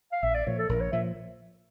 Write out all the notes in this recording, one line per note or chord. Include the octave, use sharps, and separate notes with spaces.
F5
A#1 E5
D5
A#2 F3 C#5
A4
A#1 A#4
C#5
A#2 F3 E5